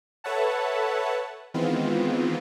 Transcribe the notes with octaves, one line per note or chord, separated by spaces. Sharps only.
A4 B4 C#5 E5 F#5 A5
D#3 E3 G#3 B3 C4 F4